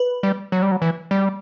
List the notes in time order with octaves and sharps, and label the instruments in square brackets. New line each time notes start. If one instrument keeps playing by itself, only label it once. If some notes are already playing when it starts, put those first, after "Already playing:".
Already playing: [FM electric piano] B4
[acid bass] G3
F#3
G3
F#3
E3
G3